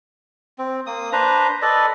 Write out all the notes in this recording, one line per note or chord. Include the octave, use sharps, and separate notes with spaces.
C4
A#3 D#6
D4 B4 C5 A#5
A4 B4 D5 D#5